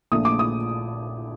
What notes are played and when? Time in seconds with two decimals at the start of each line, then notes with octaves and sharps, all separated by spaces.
0.12 A#1 A#2 A3 D#6
0.25 D6
0.39 D#6